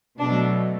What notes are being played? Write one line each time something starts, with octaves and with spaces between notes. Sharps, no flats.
B2 F#3 A3 D4